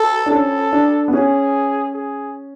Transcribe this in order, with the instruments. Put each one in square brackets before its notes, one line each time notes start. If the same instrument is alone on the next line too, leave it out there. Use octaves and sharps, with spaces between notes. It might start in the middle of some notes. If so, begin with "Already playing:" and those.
Already playing: [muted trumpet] A4
[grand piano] D4
[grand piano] C#4 [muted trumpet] A4
[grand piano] D4
B3
[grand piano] C#4 [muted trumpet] G#4
[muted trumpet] G#4